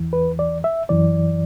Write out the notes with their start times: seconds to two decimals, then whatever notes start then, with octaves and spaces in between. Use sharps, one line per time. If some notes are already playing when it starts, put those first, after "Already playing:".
Already playing: E2 E3
0.13 B4
0.39 D5
0.64 E5
0.89 F#2 E3 D5